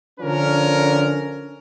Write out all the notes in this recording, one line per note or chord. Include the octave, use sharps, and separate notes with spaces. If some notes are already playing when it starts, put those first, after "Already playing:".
D3 F3 C#4 D4 A#4